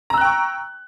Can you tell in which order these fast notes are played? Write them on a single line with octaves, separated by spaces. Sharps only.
A#5 E6 F#6 G5 C#6